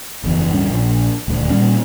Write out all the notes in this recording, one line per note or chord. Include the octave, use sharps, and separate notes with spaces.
F#1 E2
D1 G2 C#4
A#1
D#1 D2
A#2 G3 C#4